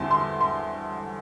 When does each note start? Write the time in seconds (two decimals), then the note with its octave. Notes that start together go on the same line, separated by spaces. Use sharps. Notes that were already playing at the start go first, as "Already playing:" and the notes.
Already playing: E2 D3 G3 C4 E4 C5 A5 C6
0.11 C6
0.41 C6